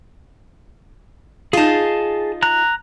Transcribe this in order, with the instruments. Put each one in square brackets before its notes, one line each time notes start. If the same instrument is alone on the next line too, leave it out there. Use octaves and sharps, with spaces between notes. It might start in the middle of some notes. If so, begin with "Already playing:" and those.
[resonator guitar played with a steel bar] D#4 F4 [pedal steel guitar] G#4 A5
[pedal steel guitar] A#5 F#6